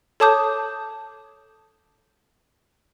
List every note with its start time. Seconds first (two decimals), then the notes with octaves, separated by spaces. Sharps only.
0.20 A4 C#5 A5 D6 D#6 G6